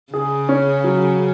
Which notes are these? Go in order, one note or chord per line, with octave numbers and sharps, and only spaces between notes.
C#3 G#4
C#4
F#3